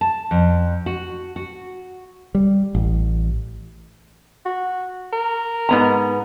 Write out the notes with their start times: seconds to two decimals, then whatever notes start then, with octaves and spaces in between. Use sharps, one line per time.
0.01 A5
0.31 F2
0.86 F#4
1.36 F#4
2.35 G3
2.75 A1
4.45 F#4
5.13 A#4
5.69 G#2 B3 A#5